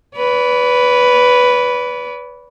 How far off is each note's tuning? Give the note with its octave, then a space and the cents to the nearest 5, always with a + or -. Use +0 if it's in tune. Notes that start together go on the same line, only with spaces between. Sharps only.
B4 +0 D5 -45